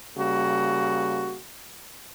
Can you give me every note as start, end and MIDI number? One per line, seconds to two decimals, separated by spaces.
0.16 1.37 49
0.16 1.37 55
0.16 1.37 58
0.16 1.37 66